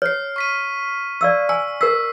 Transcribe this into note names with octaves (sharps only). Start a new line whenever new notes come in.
C#5 F6 C7
C#6 B6 D#7
D5 F5 E6
G#5 E6
A#4 E6 B6 C7